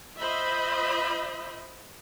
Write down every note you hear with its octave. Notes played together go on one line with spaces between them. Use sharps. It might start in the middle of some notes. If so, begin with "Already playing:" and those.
F4 C5 D#5 E5 B5